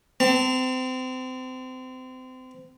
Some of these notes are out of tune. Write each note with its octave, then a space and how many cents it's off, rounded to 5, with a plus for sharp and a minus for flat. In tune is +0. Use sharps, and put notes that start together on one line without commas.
C4 -30 A5 +35